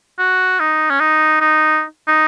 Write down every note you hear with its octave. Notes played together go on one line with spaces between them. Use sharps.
F#4
D#4
C#4
D#4
D#4
D#4